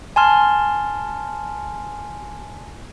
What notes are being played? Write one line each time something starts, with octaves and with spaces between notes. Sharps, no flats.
G#5 A5 C6 F6